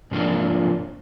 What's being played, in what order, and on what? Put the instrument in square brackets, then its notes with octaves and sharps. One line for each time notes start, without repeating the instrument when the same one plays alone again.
[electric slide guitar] G#2 C3 F3 A#3 D4 F4